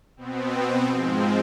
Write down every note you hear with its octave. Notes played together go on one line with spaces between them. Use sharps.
B2 B3 C4
G#2 F3 G#3 C4